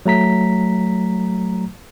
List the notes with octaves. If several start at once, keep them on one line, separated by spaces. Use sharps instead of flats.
F#3 A3 A#5 B6